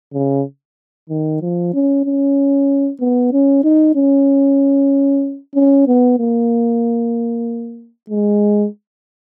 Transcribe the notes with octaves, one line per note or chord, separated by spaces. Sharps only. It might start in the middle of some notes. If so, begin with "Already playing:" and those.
C#3
D#3
F3
C#4
C#4
B3
C#4
D#4
C#4
C#4
B3
A#3
G#3